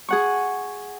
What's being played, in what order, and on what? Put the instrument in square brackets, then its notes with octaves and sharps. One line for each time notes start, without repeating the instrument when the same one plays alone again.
[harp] G#4 F#5 C#6